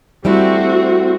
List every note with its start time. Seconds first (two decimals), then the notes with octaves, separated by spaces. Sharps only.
0.25 G3 A3 C4 E4 F#4